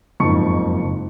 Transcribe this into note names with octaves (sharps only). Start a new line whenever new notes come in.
F#1 F2 G#2 A5 C#6 C#7